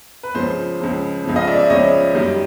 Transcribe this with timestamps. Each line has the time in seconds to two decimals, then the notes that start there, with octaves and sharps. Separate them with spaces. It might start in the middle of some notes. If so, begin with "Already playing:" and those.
0.23 B4
0.35 C#2 C#3 F3 C5
0.80 C#2 C#3 F3
1.24 C#2 C#3 F3
1.36 D#5 F5
1.47 D5 E5
1.58 D5 E5
1.70 C#2 C#3 F3 C#5 D#5
2.15 F#2 D#3 G3